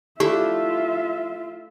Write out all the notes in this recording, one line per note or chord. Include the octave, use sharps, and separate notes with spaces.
A3 D4 E4 F4 G4 E5